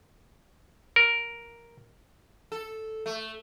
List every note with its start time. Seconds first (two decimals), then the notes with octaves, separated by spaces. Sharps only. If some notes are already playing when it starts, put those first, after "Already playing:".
0.96 A#4
2.52 A4
3.06 A3